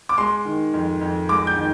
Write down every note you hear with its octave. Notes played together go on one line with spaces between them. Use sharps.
D6
G#3 C6
D#3
F2
F2
G#3 D6
G6
D#3